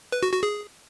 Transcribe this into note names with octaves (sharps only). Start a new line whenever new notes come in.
B4
F#4
F#4
G#4